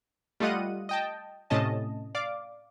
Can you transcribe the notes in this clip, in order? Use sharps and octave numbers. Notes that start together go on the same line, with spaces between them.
G3 A3 F4 D#5 F#5 D#7
D#5 G5 A5
A2 C3 A3 C#4 D#5 A5
D5 F5 D6